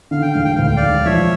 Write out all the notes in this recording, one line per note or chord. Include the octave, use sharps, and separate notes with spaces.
D3 F5
G5
E1 F5
G5
D2 F5
G5
D5 F5
E1
F3 C#5 E5